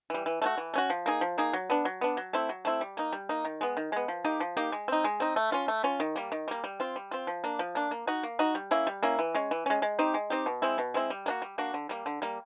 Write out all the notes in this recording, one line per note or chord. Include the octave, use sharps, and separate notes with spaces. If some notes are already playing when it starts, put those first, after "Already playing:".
E3 G3
E3
A3 C#4 F#4
E3
A3 C#4 F#4
F3
A#3 D#4 G#4
F3
A#3 D#4 G#4
F#3
B3 D4
F#3
B3 D4
F#3
A3 C4 E4
F#3
A3 C4 E4
G3
A#3 D#4
G3
A#3 D#4
D#3
G#3 B3
D#3
G#3 B3
F3
A#3 D#4 G4
F3
A#3 D#4 G4
G#3
C4 D#4
G#3
C4 D#4
A3
C#4 F4
A3
C#4 F4
D#3
G3 A#3
D#3
G3 A#3
G3
C4 F4
G3
C4 F4
F3
A#3 D4
F3
A#3 D4
A#3
D#4 F#4
A#3
D#4 F#4
G3
A#3 C#4 E4
G3
A#3 C#4 E4
E3
G#3 C#4
E3
G#3 C#4
G#3
C4 D#4 G4
G#3
C4 D#4 G4
B2
G#3 C4 E4
B2
G#3 C4 E4
G3
A#3 D4 F#4
G3
A#3 D4 F#4
D3
G3 A#3
D3
G3 A#3